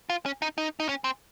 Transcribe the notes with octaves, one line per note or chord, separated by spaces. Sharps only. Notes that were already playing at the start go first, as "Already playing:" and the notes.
F4
C#4
D#4
D#4
D#4
C#4
C4